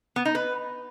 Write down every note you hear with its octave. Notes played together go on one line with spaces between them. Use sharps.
B3
D#4
B4